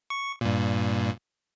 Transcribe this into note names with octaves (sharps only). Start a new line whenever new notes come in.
C#6
G2 A#2